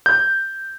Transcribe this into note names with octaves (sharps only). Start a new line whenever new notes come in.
G6